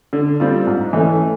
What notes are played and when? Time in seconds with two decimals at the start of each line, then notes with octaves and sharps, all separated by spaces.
0.13 D3
0.40 G3 C4 F4
0.67 G#2
0.93 E3 A3 C#4